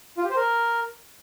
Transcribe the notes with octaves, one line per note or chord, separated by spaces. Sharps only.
F4
G4
C5
A#4